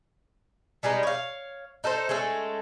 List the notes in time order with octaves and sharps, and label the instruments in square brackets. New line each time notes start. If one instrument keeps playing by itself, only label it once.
[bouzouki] G3 G#3 B3 D#4
C#5 F5
D#4 A4 A#4 C5
G#3 A3 C#4 A4